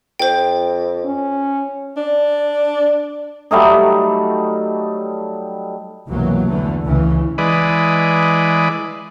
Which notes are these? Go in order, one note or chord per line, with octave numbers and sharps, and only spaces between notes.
F2 C5 G5
C#4
D4 D5
F#3 G3 A3 D#4
C2 F#2 B2 E3 F#3 A#3
E2 D3 E3 A3
C#2 C#3 E3
E3 G#3 B4 D5 D#5